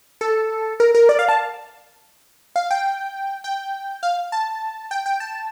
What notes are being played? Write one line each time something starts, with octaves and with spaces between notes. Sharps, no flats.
A4
A#4
A#4
D5
F5
A5
F5
G5
G5
F5
A5
G5
G5
A5